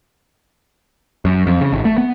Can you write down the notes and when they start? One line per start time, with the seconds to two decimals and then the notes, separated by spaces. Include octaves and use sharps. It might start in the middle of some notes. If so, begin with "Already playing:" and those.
1.25 F#2
1.47 F2
1.61 C#3
1.73 G#1
1.85 A3
1.98 B3